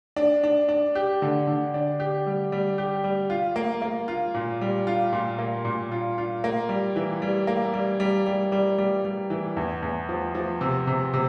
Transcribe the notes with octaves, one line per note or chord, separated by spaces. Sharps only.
D4
D4
D4
G4
D3
D3
D4
G4
G3
G3
G4
G3
F4
A#3
A#3
F4
A#2
G3
F4
A#2
A#3
A#2
F4
F4
A#3
G3
E3
G3
A#3
G3
G3
G3
G3
G3
G3
E3
E2
E2
F3
F3
C3
C3
C3